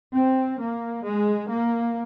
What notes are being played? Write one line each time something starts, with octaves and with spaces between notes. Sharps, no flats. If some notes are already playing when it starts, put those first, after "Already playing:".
C4
A#3
G#3
A#3